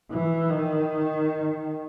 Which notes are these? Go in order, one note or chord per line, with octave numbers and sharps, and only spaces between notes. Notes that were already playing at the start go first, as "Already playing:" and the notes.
E3
D#3